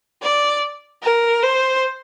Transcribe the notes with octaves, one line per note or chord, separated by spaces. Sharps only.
D5
A#4
C5